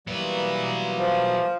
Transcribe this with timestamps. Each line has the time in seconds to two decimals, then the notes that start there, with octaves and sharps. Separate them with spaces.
0.07 E3 F#3 G3 A#3 B4
0.99 F3